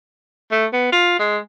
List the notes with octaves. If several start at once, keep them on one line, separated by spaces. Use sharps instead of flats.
A3
B3
F4
G#3